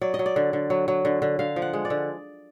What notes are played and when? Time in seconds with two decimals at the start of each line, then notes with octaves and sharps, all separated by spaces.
0.02 F#3 D5
0.14 D#5
0.19 F#3
0.26 D5
0.36 D3
0.53 D3
0.70 F#3
0.88 F#3
1.05 D3
1.22 D3
1.39 D3 F5
1.56 F3
1.62 F#5
1.73 G#3
1.85 D5
1.90 D3